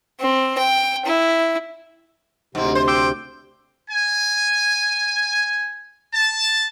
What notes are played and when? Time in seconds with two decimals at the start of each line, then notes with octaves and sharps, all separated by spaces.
0.21 C4
0.58 G5
1.05 E4
2.55 D2 G#2 C3 C4
2.75 C5
2.88 G5 C6 D6 E6
3.90 G#5
6.14 A5